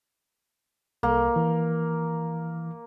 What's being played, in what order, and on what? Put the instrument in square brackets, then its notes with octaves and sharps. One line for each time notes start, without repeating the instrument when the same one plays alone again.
[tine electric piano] C2 [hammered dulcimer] A#3
[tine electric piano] E3